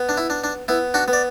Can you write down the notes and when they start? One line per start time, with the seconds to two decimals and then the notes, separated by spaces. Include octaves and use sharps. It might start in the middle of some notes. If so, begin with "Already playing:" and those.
Already playing: B3
0.09 D4
0.17 E4
0.30 D4
0.44 D4
0.68 B3 E4
0.94 D4 F#4
1.08 B3
1.13 D5